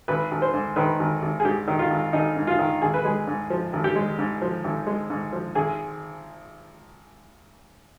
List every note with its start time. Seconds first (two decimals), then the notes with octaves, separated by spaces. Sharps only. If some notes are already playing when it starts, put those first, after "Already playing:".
0.08 G#1 B4
0.31 G#1
0.42 C5
0.54 G#2
0.76 D#3 B4
0.99 G#1
1.22 G#1
1.40 G#4
1.45 G#2 G4
1.68 D#3
1.79 F4
1.90 G#1
2.13 G#1 D#4
2.36 G#2
2.47 F4
2.59 D#3
2.82 G#1 G#4
2.94 B4
3.05 G#3 G#4
3.27 G#2
3.50 F3
3.73 G#1
3.84 G4
3.96 G#3
4.18 G#2
4.42 F3
4.64 G#1
4.87 G#3
5.10 G#2
5.33 F3
5.55 G#1 G#4